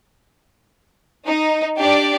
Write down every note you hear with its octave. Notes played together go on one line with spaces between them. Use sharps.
D#4
D4 G4 D5